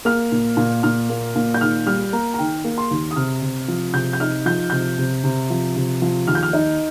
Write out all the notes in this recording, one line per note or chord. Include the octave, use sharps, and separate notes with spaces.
A#3 F6
A#2
A#2
A#2 F6
A#3
A#2
G6
D#3 F6
G3 F6
A#3 A#5
A#5
D#3 G5
A#3
C6
D#2
D#6
C3 F6
C3
F3
C3 G6
G6
D#4 F6
F3 G6
C3 G6
C3
C3
F3
C3
F3
D#2 F6
G6
F6
D#4